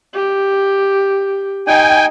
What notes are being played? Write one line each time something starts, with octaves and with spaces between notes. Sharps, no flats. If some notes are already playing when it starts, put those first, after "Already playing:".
G4
D#4 G5 G#5